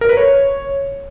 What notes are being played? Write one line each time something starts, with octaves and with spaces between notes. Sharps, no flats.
A#4
B4
C#5